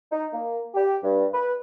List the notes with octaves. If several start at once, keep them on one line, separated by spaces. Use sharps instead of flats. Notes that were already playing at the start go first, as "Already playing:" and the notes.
D#4
A#3
G4
G2
B4